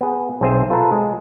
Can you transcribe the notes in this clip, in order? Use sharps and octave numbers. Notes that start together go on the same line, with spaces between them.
B3 G#4
B1 C4 G#4 C5 E5
F4 A4 B4 A5 A#5
G#3